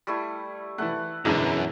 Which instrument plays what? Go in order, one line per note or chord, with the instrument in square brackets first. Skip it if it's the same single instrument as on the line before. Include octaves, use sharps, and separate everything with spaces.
[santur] G3 A3 E4
[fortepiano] E3 A3 [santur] A4 F#5
[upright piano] E1 E3 [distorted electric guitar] F#2 [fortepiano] B2 D3 G#3 [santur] E5 A#5